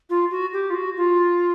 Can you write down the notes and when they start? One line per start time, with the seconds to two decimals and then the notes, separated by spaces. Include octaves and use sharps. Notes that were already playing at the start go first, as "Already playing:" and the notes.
0.10 F4
0.31 F#4
0.53 G4
0.70 F4
0.75 F#4
0.97 F4